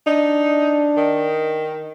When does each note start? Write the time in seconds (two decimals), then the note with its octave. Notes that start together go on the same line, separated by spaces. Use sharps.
0.07 D4 D#4
0.97 D#3